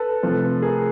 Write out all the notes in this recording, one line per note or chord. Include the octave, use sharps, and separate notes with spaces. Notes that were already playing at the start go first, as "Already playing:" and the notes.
Already playing: A4 B4
C3 F3 A3
G#4 A#4